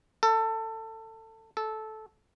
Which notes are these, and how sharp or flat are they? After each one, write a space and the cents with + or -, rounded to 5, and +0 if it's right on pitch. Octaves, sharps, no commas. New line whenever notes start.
A4 +20
A4 -15